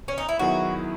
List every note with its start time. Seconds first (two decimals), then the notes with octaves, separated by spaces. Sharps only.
0.08 C#4
0.18 D#4
0.28 E4
0.39 D#3 F#3 B3 E4 F#4 G#4